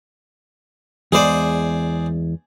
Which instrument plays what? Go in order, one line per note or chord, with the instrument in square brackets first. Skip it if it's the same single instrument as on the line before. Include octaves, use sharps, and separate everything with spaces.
[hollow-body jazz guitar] E2 G#3 [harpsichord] G#4 C5 D5